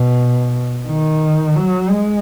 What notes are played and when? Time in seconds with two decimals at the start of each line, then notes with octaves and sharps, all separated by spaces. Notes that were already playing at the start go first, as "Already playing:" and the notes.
Already playing: B2
0.87 D#3
1.56 F#3
1.90 G#3